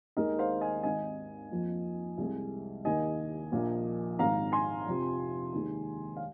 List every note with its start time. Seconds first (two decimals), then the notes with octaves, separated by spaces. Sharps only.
0.17 D#2 D#3 G#3 A#4 D#5
0.39 C5 F5
0.61 D#5 G#5
0.83 G#1 G#2 D#3 D#5 G#5
1.50 F2 F3 A#3
2.18 C2 C3 G#3
2.85 D#2 D#3 A#3 D#5 G#5
3.52 A#1 A#2 F3 A#3
4.19 G#1 G#2 D#3 G#3 F5 A#5
4.52 G#5 C6
4.86 F2 C3 F3
5.54 D#2 D#3 G#3
6.17 F5